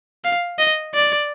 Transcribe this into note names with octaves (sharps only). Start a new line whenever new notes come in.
F5
D#5
D5